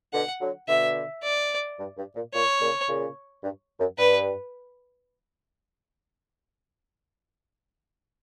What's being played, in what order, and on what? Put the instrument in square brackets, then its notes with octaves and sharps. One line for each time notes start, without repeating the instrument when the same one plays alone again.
[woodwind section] B2 D3 [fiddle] F#5
[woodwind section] D3 F#3
[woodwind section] B2 D3 [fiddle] E5
[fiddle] D5
[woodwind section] G2
G2
A#2
[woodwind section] A#2 [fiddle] C#5
[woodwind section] A#2 C#3
A#2 C#3
G2
F#2
[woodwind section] G2 [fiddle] B4